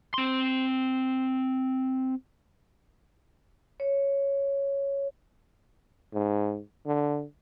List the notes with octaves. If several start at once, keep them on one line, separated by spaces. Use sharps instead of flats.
C4 C6
C#5
G#2
D3